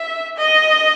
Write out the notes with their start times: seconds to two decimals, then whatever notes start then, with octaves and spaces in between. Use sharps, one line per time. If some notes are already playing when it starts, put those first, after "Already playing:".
Already playing: E5
0.37 D#5